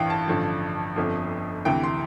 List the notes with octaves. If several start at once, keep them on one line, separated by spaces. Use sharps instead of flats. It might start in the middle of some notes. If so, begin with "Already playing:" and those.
Already playing: A1 G2 E3 F5 G5
A5
A1 G2 D3 F3
G1 F2 D3 F3
D2 C3 E3 G5
C6